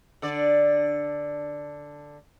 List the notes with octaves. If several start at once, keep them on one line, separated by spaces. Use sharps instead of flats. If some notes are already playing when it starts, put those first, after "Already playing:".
D3 D5